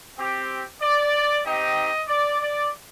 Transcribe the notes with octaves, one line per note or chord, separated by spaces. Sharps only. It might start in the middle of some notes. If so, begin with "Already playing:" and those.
C4 G4
D5
C4 D#4 G4 D#5
D5
D5